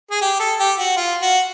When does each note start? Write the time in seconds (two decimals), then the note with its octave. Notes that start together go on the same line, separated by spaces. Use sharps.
0.11 G#4
0.22 G4
0.40 A4
0.60 G4
0.79 F#4
0.96 F4
1.22 F#4